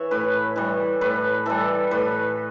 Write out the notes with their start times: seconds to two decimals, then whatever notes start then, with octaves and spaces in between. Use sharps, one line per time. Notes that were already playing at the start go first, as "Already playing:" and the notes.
Already playing: E3 C#5 E5
0.11 A2 B4
0.56 E3 G3
1.01 A2 B4
1.46 E3 G3 A4
1.91 A2 B4